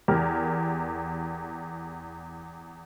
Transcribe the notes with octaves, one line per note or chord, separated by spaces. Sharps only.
E2 G4 A#4 F6